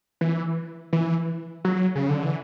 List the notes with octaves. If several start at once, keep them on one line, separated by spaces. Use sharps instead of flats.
E3
E3
F#3
C#3
D3
E3